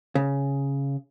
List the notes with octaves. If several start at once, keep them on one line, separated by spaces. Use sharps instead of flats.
C#3